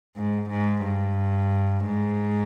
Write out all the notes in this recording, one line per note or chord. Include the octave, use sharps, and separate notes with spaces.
G#2
G#2
G2
G#2